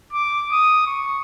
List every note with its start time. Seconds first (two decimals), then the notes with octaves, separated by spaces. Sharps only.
0.13 D6
0.52 D#6
0.87 C#6